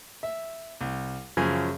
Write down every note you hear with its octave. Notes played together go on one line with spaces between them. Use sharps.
E5
C2
F#2 C#3 F3 G#5